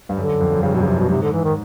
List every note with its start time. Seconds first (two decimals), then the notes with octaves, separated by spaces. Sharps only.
0.09 G2
0.16 F#2 D3
0.28 F#2
0.41 F2
0.52 F#2
0.63 G2 C#3
0.75 F#2 B2
0.82 C#3
0.86 F2 C3
0.98 F#2 B2
1.09 G#2 C3
1.21 D3
1.33 E3
1.44 D#3